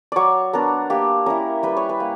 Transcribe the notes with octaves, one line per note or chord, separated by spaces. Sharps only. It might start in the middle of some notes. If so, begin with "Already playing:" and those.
F#3 C#5 D5
B3 D4 A#4
A#3 G4
C#4 E4 A#4
G3 B4
C#5
B4
A#3